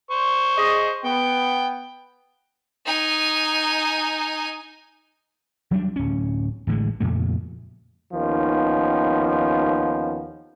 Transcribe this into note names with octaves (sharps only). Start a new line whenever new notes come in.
C5 C#6
G#4 D#5
B3 G5
D#4 G#5
F#3 G3 A#3 D4
D1 C#4
A1 A2 D3 G#3
F2 A#2 C#3 A3
D#2 D#3 F3 B3 C#4